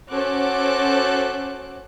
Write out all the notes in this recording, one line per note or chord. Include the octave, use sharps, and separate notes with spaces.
C#4 F#4 A4 C5 D6 F#6